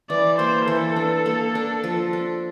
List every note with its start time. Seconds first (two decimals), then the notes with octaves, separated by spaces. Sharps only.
0.10 E3 D5
0.38 A#3 C5
0.67 E3 A4
0.96 D4
1.26 A#3
1.55 D4
1.84 F3
2.13 D4